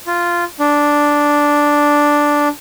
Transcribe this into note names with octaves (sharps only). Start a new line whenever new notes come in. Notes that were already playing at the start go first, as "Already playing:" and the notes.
F4
D4